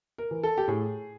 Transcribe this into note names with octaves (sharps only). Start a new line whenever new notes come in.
A#4
E3
A4
G4
A2 G#4